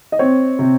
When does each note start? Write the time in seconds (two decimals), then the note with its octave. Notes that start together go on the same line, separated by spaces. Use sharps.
0.12 D#5
0.19 C4 C#5
0.59 C3